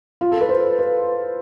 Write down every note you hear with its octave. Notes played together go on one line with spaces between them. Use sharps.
F4
A4
B4
C5
B4